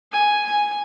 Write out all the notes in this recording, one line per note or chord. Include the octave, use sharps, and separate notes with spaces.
G#5
G#5